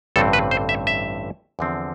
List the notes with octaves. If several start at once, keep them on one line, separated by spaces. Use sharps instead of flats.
A1 G2 D3 A3 C4 A4
B4
C5
E5
E5
E2 D3 F3 C4